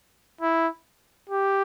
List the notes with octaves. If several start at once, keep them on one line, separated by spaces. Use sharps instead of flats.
E4
G4